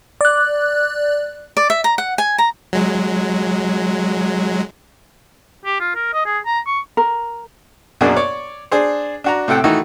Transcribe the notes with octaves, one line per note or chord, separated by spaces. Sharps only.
D5 F#6
D5
E5
A#5
F#5
G#5
A#5
F#3 G#3
G4
F4
A#4
D#5
G#4
A#5
C#6
A#4
F#2 B2 A#3 D4 F#4 G#4
C#5 D5 D6
D4 G#4 C5
D4 F#4 A#5
A2 C3 A4 F#5 G5
D#3 E3 A3 D#4 F#4